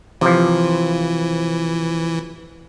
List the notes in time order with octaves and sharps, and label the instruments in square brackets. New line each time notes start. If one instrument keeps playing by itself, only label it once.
[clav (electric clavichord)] C3 F3 [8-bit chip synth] E3